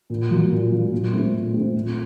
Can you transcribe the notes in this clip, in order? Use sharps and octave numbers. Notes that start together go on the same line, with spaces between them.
A#2
F#3 A#3
A#2
F#3 A#3
A#2
A3 C4
A#2
A3 C4
A#2